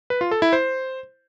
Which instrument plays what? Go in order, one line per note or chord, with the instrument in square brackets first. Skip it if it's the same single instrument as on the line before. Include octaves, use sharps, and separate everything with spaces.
[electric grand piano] B4
F4
A4
E4
C5